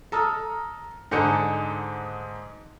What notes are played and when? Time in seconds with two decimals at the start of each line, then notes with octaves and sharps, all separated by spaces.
0.12 A4 A#5 D#6 F6
1.11 G#2 D3 D#4 G#4 C#7